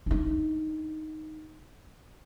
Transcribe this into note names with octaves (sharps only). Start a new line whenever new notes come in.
D4 D#4